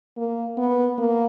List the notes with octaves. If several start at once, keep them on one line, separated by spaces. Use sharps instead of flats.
A#3
B3
A#3